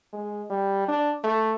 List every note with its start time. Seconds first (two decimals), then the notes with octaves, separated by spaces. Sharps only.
0.13 G#3
0.50 G3
0.88 D4
1.24 A3